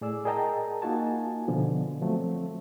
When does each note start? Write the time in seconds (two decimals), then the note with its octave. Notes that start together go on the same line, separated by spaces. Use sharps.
0.01 A2 G#4 D5 E6
0.25 G#4 A#4 D#5 G5 A5 A#5
0.82 A#3 D#4 F4 F#4 G#5 A5
1.48 B2 D3 F3
2.02 F3 F#3 A3 C4